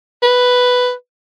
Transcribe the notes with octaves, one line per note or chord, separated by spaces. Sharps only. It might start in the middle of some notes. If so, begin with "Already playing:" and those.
B4